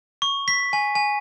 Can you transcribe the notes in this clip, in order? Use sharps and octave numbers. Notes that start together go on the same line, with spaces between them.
C#6
B6
G#5
G#5